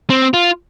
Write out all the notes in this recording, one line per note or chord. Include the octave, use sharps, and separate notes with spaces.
C4
F4